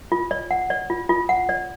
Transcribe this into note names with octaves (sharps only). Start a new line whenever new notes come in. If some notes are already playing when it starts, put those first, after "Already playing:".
F4
D5
F#5
D5
F4
F4
F#5
D5